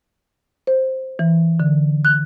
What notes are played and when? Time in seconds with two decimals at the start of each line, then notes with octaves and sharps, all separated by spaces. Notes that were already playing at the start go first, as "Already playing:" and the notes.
0.67 C5
1.19 E3
1.60 D3
2.05 F#6